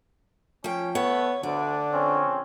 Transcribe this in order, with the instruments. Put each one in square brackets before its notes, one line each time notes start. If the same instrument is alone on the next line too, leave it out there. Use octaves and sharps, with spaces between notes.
[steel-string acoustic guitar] F3 G5 [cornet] C#4
[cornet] A3 [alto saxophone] B3 [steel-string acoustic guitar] C#5
[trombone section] D2 [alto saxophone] D3 [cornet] D4 [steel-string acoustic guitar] D5
[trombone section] A#1 C4 C#4